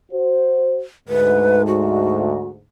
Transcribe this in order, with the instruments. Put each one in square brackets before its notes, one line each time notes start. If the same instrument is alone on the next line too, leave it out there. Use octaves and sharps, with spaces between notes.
[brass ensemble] F#4 C5
[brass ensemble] D2 G#2 [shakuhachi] B4
[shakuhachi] F#4